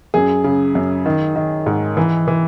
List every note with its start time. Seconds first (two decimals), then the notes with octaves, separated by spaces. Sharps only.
0.14 F#2 G#4
0.44 C#3
0.75 F#2
1.06 D#3
1.36 D#3
1.66 G#2
1.97 E3
2.28 E3